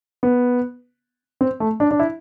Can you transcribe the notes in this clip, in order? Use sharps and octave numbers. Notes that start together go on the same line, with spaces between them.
B3
C4
A3
D4
D4
E4